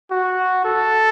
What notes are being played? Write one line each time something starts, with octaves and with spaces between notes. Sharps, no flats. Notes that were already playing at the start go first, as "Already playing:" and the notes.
F#4
A4